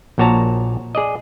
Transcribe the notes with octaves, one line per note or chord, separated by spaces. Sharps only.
A#1 A#2 F#4 C#5 A5 A#5
G#4 D5 D#5